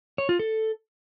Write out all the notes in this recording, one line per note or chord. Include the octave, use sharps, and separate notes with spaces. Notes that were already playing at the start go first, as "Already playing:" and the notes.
C#5
F4
A4